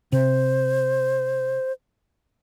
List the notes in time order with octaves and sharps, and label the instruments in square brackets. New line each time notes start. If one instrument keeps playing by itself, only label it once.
[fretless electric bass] C3 [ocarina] C5